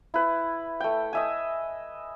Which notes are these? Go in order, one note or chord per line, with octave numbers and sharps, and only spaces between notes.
E4 B4
A3 G5
D#5 E5 G#5